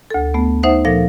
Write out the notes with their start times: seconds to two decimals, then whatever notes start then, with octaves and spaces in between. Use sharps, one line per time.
0.10 D2 A4
0.34 A3 B3
0.63 D#4 C5 E5 F#5
0.85 A#2 F3 A4 F5 A#6